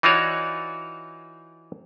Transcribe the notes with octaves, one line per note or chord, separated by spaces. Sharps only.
E3 D#4 F4 F#4 C#5 D5